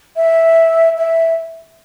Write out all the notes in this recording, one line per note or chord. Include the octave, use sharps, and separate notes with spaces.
E5
E5